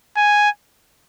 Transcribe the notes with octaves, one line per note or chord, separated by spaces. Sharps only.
G#5